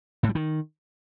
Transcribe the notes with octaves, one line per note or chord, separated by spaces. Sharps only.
A2
G3
D#3